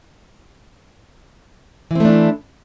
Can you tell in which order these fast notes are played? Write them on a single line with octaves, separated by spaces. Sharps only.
E3 C4 A3 D4 E4